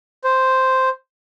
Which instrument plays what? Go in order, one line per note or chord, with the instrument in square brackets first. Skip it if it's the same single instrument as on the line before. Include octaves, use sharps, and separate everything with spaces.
[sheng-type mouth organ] C5